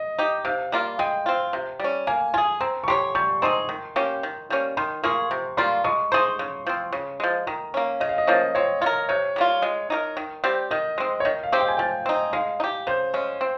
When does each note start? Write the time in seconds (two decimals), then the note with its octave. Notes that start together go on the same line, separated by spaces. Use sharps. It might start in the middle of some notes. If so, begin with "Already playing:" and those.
Already playing: D#5
0.19 D#4 G4
0.45 C3 F5
0.72 G3 A#3 F4
0.99 G#3 G5
1.26 C4 F4
1.53 C3
1.80 G3 C#4
2.07 A#3 G#5
2.34 F4 G#5
2.38 G#4
2.61 C4 A#5
2.84 C#6
2.88 G4 A#4 C#5 C6
3.15 G3 C#6
3.42 C4 D#4 G#4 C6
3.69 D#3
3.96 A#3 C#4 G4
4.23 D#3
4.50 G3 A#3 C#4
4.77 D#3 C6
5.03 A#3 F4 G#4 C#6
5.31 C3
5.57 G3 A#3 F4 C6
5.84 G#3 C#6
6.12 D#4 G#4 C5 C6
6.39 C#3
6.66 F3 C4
6.93 C#3
7.20 F3 G#3
7.47 D#3 A#5
7.74 A#3 C#4
8.00 C#3 D#5
8.09 F5
8.18 D#5
8.27 F3 A#3 C#4
8.55 C4 C#5
8.81 F4 C#5
8.86 A#4
9.09 C3 C#5
9.36 G3 A#3 F4
9.62 G#3
9.90 D#4 G4 A#4
10.17 D#3
10.44 G3 C4 G4
10.71 D#3 D#5
10.98 G#3 C4
11.20 C#5
11.25 D#3 D#5
11.43 F5
11.52 G#3 C4 G4
11.61 G5
11.68 G#5
11.77 F3 G5
12.06 C4 D#4
12.33 G#3 F5
12.60 D#4
12.64 G4
12.87 C#3 C5
13.14 G#3 C#4
13.41 C4